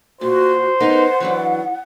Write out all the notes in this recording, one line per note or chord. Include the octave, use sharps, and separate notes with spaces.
A#2 F#4 C5
B3 D#4 A#4 F#5
E3 F#3 D4